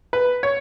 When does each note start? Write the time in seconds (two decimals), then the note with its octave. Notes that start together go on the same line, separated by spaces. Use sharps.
0.13 B4
0.43 C#5